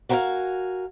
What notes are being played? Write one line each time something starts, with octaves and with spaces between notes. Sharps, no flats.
F#4 A#4 B4 E5 F5 G#5